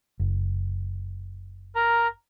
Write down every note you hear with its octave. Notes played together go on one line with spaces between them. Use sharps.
F#1
A#4 A#5